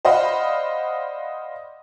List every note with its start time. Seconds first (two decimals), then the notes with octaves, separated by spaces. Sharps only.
0.05 C5 D5 D#5 F5 F#5 B5